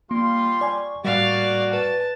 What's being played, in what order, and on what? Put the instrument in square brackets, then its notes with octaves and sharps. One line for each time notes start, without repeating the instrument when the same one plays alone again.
[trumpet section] G3 F4 C6 [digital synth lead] A#3
[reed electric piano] D5 G#5 [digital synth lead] C#6
[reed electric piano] A2 G3 [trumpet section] A#3 F#4 [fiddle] D5 F5 [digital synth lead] C#6
[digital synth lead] B4 [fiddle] A5